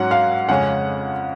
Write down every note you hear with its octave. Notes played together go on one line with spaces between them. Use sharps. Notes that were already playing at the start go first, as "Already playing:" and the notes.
Already playing: G#2 F#3 C#4 F#5
F5
F2 C#3 G#3 C#4 F#5